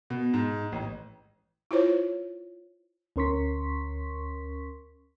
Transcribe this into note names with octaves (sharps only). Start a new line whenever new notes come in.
B2
G#2
A1
E4 F4 C5 C#5
D2 C#4 A#4 C6 C#6 B6